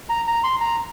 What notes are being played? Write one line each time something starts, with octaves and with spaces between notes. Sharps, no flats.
A#5
A#5
C6
A#5